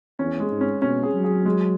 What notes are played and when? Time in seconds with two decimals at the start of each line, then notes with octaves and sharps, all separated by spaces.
0.19 E2 C#4
0.40 G#3
0.51 G#2
0.61 C#4
0.82 B2 C#4
1.03 G#4
1.14 F#3
1.24 G#4
1.46 G#3